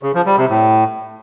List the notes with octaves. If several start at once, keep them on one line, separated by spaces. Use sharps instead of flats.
C#3
F3
G3
C3
A2